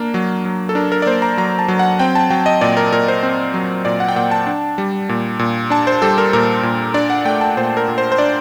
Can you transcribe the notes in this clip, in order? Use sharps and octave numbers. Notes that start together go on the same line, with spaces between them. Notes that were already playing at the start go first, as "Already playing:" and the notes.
Already playing: A#3 D4 A#4
F#3
F#3
A4
D4 A#4
A#4
D5
A#3 C5
A#5
F#3 A#5
A5
F#3
F#5
C4 G5
A5
F#3 G5
D#5
A#2 D5
A#4
A#2 A#4
C5
C4
F#3
A#2 D5
F#5
G5
A#2 F#5
A5
D4
G3
A#2
A#2
D4 A5
C5
G3 A4
A#4
A#2 A#4
A#2
D4 D5
F#5
A3 G5
A5
A#2 C5
A#4
A#2
C5
C5
D4 D5